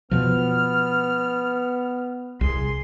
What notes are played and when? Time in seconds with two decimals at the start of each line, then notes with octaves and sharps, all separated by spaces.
0.11 B2 F3 B3 F6
2.41 C2 G#4 C6